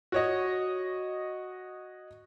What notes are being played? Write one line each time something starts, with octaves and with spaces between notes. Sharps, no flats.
F#4 C#5 D#5